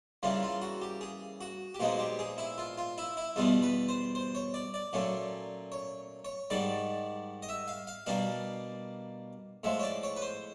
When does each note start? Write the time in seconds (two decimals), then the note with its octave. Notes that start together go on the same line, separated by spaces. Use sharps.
0.23 C#3 E3 G3 A#3 F4
0.43 F4
0.62 F#4
0.82 G4
1.01 G#4
1.41 F#4
1.75 G4
1.80 A#2 F3 G#3 B3 D#4 F#4
1.99 G4
2.19 G#4
2.38 E4
2.58 F4
2.78 F4
2.98 E4
3.17 E4
3.36 E2 B2 G3 B3 F4
3.62 B4
3.88 C5
4.15 C5
4.35 C#5
4.54 D5
4.74 D5
4.93 A#2 F#3 A3 C#4
5.72 C#5
6.25 C#5
6.50 G#2 D#3 G3 D5
7.42 D#5
7.49 E5
7.68 F5
7.87 F5
8.06 B2 G3 A#3 D4 F5
9.64 A2 F3 G#3 E5
9.79 C#5
9.83 D5
10.03 C#5
10.16 B4
10.22 C5